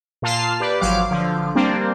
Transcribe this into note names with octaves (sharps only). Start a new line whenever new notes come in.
A#2 F4 A5 F6 C7
G4 B4 D5
G#1 F3 F#3 F5 D6
D3 F3
G3 A#3 C4 D4